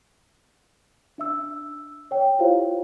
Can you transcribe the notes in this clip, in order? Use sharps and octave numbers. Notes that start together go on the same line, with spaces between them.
D4 E5 E6
C#5 G5
E4 F4 G4 C5 C#5 F5